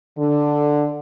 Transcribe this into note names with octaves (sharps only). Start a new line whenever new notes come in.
D3